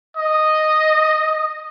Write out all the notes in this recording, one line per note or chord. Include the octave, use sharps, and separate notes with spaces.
D#5